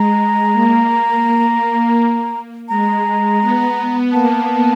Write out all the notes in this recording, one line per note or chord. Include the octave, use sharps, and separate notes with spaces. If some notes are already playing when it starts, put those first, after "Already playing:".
Already playing: G#3 A#5
A#3
G#3 A#5
B3
A#3 A5